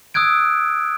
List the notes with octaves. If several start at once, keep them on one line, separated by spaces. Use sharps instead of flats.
D#6 E6 F#6 G#6 D7